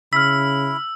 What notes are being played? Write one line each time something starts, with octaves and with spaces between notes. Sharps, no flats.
C#3 E4 E6 F6 B6